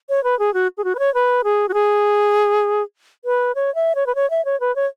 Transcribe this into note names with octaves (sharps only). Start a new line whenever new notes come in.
C#5
B4
G#4
F#4
G#4
F#4
B4
C#5
B4
G#4
F#4
G#4
B4
C#5
E5
C#5
B4
C#5
E5
C#5
B4
C#5